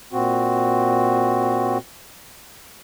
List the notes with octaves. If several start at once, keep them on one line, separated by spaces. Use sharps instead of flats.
A#2 C4 F#4